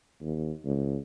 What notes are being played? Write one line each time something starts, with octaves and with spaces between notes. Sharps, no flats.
D#2
C#2